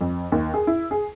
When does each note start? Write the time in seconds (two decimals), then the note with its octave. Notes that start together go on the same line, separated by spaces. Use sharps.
0.01 F2
0.32 D#2
0.54 G#4
0.67 E4
0.91 G#4